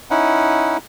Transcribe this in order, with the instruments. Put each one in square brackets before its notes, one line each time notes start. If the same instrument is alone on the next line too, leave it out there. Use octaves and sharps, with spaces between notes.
[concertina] C#4 D#4 E4 F#5